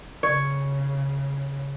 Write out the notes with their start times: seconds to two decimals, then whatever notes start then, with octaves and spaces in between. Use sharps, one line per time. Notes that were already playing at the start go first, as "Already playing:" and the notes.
0.23 C#3 C#5